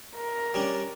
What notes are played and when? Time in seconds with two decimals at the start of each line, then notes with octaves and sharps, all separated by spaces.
0.16 A#4
0.54 G3 C#4 D4